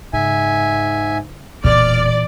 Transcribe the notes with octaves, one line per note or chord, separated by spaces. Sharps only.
G#2 C#3 E5 G#5
E1 A#2 E3 D5 F6